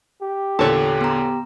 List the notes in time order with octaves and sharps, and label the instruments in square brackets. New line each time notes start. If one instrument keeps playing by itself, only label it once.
[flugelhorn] G4
[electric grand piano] E2 A#2 D3 [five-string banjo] A4 C#5
[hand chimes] B3 A#5